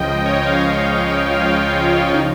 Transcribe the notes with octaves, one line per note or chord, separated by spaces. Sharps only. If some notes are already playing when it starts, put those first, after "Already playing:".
Already playing: C#2 C#3 F3 D#5 G5
C#5
D#5
F5
F4
D#4
F3